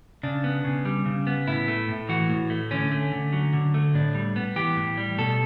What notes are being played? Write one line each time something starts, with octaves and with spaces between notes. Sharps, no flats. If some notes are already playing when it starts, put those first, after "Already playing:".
C#3 D4
B3
C#3
G3
C#3
B3
A2 E4
A3
A2
E3 F#4
A2
A3
D3 C#4
A3
D3
F#3
D3
A3
A2 D4
G3
B3
E3 G4
A2
G3
B2 A4